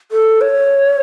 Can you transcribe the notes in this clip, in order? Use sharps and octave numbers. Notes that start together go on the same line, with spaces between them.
A4
C#5